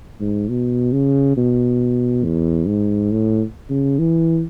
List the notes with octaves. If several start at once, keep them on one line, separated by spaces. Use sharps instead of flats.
G#2
B2
C#3
B2
E2
G#2
A2
C#3
E3